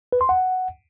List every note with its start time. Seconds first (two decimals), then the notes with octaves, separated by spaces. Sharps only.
0.12 B4
0.21 C6
0.29 F#5